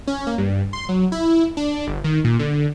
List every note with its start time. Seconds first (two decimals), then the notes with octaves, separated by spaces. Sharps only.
0.07 C#4
0.27 A#3
0.38 G2
0.73 C6
0.89 F#3
1.12 E4
1.57 D4
1.87 G1
2.04 D#3
2.24 A#2
2.39 D3